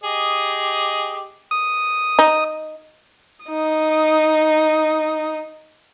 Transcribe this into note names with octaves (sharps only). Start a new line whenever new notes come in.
G4 G#4 D#5
D#6
D#4
D#4 D#6